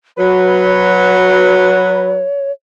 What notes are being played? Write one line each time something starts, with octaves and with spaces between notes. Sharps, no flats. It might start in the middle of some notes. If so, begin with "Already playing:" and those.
F#3 B4 C#5